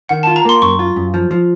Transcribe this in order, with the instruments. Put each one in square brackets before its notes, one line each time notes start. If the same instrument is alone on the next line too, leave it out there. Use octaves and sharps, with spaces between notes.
[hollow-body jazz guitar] D#3 [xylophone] F#5
[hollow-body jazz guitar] F4 [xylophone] A5
[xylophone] A#5
[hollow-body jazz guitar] A#3 [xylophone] C6
[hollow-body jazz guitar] F#2 [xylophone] C#6
[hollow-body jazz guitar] F4
F#2
F3
F3